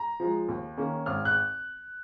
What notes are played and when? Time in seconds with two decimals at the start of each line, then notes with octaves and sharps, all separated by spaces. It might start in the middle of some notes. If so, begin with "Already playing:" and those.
Already playing: A#5
0.20 F3 G#3
0.48 D#2
0.77 D#3 A#3 C#4
1.06 G#1 F6
1.25 F#6